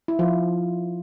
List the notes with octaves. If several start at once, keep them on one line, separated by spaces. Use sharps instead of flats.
E4
F3 F4